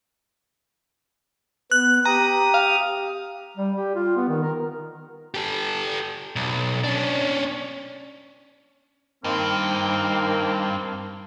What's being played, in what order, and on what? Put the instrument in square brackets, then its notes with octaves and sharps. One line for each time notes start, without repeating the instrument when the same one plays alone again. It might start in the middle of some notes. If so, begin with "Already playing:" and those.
[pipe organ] B3 [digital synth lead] F#6
[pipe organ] G4 D#6 [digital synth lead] A#5
[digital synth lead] F5
[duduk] G3
G4
F4
B3
D#3
A#4
[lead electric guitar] G4 A4
B1
C#4 D4
[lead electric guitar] G2 [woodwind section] D#3 A#3 C4